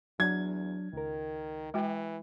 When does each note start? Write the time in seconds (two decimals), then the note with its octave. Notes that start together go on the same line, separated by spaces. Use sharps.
0.20 E2 F#3 D4 G#6
0.93 C#2 D#3 A#4
1.74 E3 G#3 F#4 G5